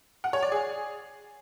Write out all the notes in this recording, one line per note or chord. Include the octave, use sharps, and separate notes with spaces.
F#5
C#5
D5
G#4